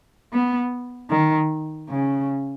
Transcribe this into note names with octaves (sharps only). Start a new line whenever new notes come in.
B3
D#3
C#3